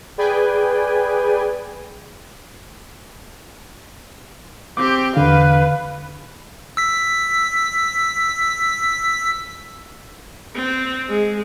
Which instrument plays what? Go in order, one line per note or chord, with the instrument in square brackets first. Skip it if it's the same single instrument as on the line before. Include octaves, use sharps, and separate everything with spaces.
[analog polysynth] G#4 B4 D5 G5 G#5
[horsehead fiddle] C4 G4 [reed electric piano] D6
[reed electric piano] E2 D3 [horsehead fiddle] B4 F5
[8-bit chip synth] E6 B6
[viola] C4
G#3